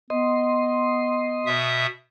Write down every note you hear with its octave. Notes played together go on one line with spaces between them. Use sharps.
B3 D#5 C6
B2 E5 D#6